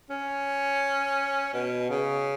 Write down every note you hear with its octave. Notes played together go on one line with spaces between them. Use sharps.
C#4
B2
C#3